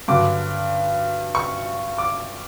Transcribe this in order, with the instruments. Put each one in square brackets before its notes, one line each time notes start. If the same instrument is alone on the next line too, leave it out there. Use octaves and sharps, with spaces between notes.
[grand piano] G2 D3 F#3 D6
C#6
D6